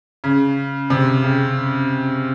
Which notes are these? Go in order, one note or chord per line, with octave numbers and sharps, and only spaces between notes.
C#3
C3
C#3